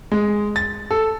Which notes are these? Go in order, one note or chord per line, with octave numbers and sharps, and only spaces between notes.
G#3
A6
A4